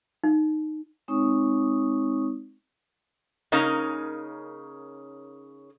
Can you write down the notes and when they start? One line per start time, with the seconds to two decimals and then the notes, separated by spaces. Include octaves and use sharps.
0.24 D#4
1.08 G#3 C4 D#4 C#5 C#6 D#6
3.52 C#3 A#3 C#4 D#4 A#4